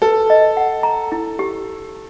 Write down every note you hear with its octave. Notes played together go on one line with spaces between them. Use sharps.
A4 B4
D#5
F#5
A#5
E4
G4